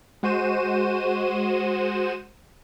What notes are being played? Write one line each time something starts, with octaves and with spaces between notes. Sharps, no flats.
G#3 F#4 C5 D#7 E7